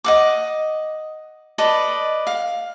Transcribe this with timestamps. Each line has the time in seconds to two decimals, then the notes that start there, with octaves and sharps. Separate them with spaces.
0.04 D#5 F#5 D6
1.58 A4 B4 D5 D#5
2.27 F5